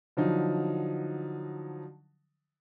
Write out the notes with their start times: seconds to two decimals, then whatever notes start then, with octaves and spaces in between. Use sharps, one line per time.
0.17 D3 F3 F#3 D#4